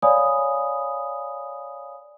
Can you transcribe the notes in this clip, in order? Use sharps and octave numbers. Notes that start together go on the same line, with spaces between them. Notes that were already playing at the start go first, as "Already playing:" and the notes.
C#5 D5 F5 G#5 B5 D#6